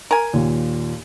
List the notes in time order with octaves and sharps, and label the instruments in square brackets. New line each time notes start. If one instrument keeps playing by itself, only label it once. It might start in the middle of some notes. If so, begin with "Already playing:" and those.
[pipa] A#4 G#5
[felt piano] D#2 A#2